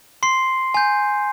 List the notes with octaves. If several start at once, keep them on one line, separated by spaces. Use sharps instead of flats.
C6 C7
G#5 G6